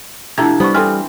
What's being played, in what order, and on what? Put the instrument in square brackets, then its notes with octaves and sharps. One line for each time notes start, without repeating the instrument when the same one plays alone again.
[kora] C3 F3 A3 [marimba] D4 E4 [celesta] A#5 G#6
[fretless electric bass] G3 [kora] B3 [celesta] C5 C#6
[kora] E3 C4 [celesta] A4 C6 F6